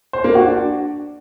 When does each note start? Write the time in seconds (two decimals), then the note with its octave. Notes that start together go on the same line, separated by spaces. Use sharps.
0.13 C5
0.24 A#3
0.35 F#4
0.46 D4